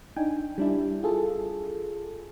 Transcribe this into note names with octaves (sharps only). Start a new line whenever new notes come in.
D4 D#4 G5 G#5
G3 D4 E4
F4 G#4 A4